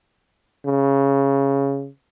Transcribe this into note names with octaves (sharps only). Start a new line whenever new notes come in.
C#3